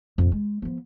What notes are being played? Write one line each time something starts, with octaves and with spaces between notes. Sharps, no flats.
F2 A#2
G#3
F3 B3